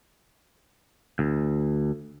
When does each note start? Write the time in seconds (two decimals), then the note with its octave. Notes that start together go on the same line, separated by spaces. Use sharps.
1.19 D2